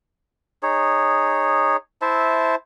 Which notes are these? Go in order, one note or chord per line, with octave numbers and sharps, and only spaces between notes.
D#4 G#4 C#5
E4 C5 E5 A5